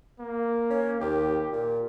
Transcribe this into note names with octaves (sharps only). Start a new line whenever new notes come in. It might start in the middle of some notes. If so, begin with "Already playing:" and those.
A#3
C#4
D#2 G4
A#2